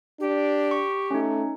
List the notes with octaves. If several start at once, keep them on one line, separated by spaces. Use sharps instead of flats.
D4 G4
C#6
A3 C#4 D#4